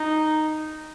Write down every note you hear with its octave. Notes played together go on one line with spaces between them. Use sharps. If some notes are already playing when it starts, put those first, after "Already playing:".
Already playing: D#4